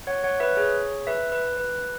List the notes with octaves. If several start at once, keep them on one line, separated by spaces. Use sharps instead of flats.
C#5 F#5
C#5 F#5
B4 E5
G#4 C#5
B4 E5
B4
B4